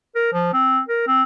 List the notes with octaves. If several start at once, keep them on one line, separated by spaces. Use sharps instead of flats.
A#4
F3
C4
A#4
C4